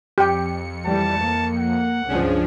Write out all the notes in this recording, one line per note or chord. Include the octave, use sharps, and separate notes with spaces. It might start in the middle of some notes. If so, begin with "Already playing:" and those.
F2 G4 G5 C#7
E3 G3 A5
A#3
F#5
C#2 G2 F3 C#4 D4 G#4